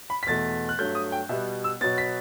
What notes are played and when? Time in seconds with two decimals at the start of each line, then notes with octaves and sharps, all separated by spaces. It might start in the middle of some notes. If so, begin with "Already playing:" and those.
0.10 B5
0.23 B6
0.27 E2 B2 A3 A6
0.69 F#6
0.79 G2 F#3 A3 G6
0.95 D#6
1.12 G5
1.29 B2 G3 B3 E5
1.64 E6
1.81 B2 F#3 B3 A6
1.98 B6